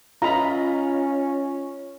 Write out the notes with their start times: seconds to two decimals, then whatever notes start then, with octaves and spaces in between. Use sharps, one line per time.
0.22 C#4 F4 D#5 A#5 B5